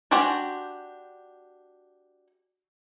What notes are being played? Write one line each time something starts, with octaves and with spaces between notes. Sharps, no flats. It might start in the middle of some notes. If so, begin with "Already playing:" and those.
D4 F#4 G4 C5 G#5